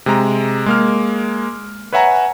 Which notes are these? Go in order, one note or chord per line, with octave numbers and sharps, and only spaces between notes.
C3 G#3 A#5
G#3 A#3 F6
B4 C#5 E5 F#5 G#5 A#5